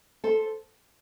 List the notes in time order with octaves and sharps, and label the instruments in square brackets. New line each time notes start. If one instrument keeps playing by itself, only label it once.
[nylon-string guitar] A4 C5